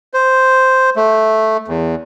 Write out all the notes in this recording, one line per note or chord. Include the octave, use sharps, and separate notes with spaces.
C5
A3
E2